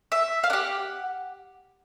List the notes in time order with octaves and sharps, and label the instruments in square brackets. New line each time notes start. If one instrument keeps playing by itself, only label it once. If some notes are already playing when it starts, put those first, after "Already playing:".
[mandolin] E5
F5
D4 G4 F#5